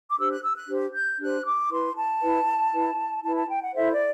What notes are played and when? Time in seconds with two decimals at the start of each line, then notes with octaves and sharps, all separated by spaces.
0.10 D6
0.17 D4 G4 C5 E6
0.30 F#6
0.43 E6
0.55 F#6
0.68 D4 G4 C5
0.94 G6
1.19 D4 G4 C5 F#6
1.44 D6
1.71 E4 B4 C6
1.96 A5
2.21 E4 B4
2.73 E4 B4
3.23 E4 B4 A5
3.35 A5
3.48 G5
3.61 F#5
3.74 E4 A4 C5 E5
3.92 D5